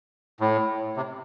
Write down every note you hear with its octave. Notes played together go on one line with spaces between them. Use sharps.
A2
C3